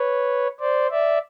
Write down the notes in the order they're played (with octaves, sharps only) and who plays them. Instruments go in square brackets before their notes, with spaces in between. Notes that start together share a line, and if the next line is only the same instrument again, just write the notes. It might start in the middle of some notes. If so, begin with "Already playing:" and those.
Already playing: [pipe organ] B4 C#5
C5 D5
D5 E5